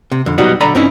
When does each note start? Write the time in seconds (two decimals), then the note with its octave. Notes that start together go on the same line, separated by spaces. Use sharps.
0.12 C3
0.26 F2 D3
0.38 B2 F#3 G3 B3 D#4 F#4
0.60 B1 D3 D5 A#5 B5
0.75 G2 C4 C#4 D#4 E4